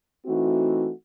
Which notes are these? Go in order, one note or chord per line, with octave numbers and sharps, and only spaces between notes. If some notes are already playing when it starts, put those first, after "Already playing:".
E3 A3 C4 D#4 F#4